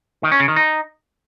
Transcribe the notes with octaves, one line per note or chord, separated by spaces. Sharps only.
D#3
C#4
C#3
D#3
D#4